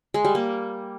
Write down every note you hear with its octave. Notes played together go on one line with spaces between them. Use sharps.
G#3
G3
A#3